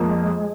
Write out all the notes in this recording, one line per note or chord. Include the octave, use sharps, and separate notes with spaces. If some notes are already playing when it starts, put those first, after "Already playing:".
Already playing: F2 F3 G#3 A#3 F4